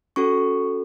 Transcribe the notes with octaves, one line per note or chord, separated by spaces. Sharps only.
C#4 F#4 A4 C#6